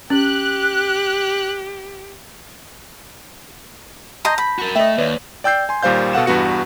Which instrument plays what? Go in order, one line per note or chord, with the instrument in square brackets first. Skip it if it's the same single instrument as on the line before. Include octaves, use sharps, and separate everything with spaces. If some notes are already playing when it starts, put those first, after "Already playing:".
[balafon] C#4 [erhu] G4 [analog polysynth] F#6
[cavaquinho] D#5 A#5 C6 [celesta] A5 G6 A#6
[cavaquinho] B5
[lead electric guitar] F#4 A#4
[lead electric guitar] A3 [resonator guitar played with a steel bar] D#5 E5 [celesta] G5
[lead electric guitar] D#2 [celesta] B4 C#5 D5
[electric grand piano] D5 G5 E6 G6 C7
G#5 C6
D#2 A#2 G3 C5 F5 G6
B2 A4 F5 F#5 E7
E2 G2 B3 F#4 C#7